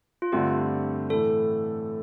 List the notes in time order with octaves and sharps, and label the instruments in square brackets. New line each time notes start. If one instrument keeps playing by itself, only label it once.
[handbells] F4
[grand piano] G2 D3 A3 C4 [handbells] G4
[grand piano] A2 E3 A3 [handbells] A4